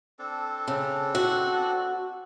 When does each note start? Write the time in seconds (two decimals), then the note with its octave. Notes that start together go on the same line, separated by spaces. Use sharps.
0.19 C4 D4 A4
0.68 C#3
1.15 F#4